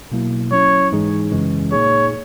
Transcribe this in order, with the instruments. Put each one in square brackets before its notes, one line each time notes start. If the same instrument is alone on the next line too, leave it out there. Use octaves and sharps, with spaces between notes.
[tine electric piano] B2 F#3 A#3 E4
[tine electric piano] F#3 C#4 E4 [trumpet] C#5
[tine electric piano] G#2 E3 G#3 D#4 G#4
F#2 C#3 E3 G#3 C#4
[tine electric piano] A#2 A#3 D#4 G#4 [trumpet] C#5